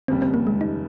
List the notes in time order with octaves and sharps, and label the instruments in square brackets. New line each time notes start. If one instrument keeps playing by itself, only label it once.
[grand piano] F1 D#2 C#3 G3 [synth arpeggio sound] C4
[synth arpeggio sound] C4
A#3
G#3
D#4